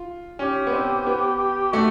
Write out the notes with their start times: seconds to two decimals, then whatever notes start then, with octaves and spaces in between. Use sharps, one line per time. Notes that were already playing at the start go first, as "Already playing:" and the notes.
Already playing: F4
0.39 C#4 G4
0.67 B3
0.73 C4
1.07 B3
1.73 A3 F#4